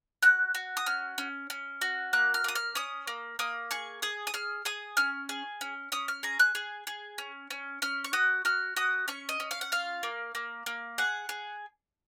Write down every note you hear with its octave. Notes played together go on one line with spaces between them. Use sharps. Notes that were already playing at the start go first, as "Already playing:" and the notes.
F#4 F#6
F#4
D#6
C#4 F6
C#4
C#4
F#4
A#3 F#6
F6
A#3 D#6
F6
C#4 D#6
A#3
A#3 D#6
G#4 C#6
G#4 D#6
D#6
G#4 F6
G#4 D#6
C#4 F6
G#4
C#4
C#4 D#6
F6
G#4 A#5
F#6
G#4
G#4
C#4
C#4
C#4 F6
C#6
F#4 D#6
F#4 F6
F#4 D#6
C#4 C#6
D#5
C#4
F5
F#5
F4 F5
A#3
A#3
A#3
G#4 F#5
G#4